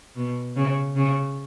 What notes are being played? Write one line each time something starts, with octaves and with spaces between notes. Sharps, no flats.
B2
C#3
C#3